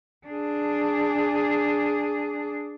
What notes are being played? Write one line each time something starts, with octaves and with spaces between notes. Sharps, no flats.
D4 G#4